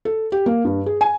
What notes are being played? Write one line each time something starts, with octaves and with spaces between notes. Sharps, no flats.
A4
G4
A#3
G2
G#4
G#5